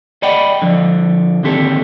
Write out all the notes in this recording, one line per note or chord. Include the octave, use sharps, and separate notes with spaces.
D5 D#5 F#5 G5 B5
D3 F3
D#2 D3 C4 G4 A4